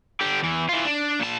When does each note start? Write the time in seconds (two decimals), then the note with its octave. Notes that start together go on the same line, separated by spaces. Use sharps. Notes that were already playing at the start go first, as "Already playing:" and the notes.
0.21 D3 G4
0.43 E2 E3
0.69 E3 F4
0.85 D4
1.20 A#2 A5